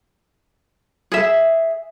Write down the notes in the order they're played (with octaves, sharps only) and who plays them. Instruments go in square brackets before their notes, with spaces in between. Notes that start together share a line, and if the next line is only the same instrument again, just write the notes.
[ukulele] G#4 E5